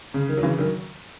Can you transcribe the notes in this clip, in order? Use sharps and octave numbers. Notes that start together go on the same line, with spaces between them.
C#3
D#3
F#3
C#3 E3
D#3 F#3